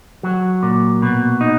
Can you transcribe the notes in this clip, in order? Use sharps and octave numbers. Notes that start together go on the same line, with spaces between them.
F#3
A#2
B2
D#4